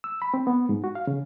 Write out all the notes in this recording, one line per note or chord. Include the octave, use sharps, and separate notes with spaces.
E6
B5
C4
B3
G#2
F#4
F5
C#3